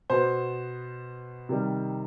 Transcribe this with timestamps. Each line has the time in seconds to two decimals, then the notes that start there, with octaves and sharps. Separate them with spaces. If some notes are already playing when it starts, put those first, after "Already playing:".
0.10 B2 B3 C5
1.49 C3 D#3 G3